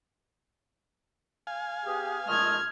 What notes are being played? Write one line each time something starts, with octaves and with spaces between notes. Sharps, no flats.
F5 G#5
B3 G4 G#4
A#2 G#3 A3 D#5 F6 G#6